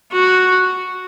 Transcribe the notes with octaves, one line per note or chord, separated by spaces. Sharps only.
F#4